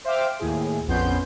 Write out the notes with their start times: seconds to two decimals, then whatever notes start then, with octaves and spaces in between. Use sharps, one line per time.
0.04 C5 E5 F5 G5 D6 F6
0.39 D#2 A2 G#4
0.87 A#1 F2 B3 C#4 C6 G6